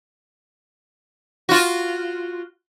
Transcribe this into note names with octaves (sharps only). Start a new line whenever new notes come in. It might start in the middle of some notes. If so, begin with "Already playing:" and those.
F4 F#4